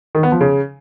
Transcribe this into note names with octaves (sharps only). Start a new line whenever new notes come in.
D#3
B3
F3
C#3